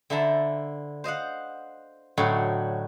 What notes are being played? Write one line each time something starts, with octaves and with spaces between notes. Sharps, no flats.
D3 E4 C5 E5 A5 A#5
C5 D#5 F5 F#5
A2 D3 F#3 D#4 F#4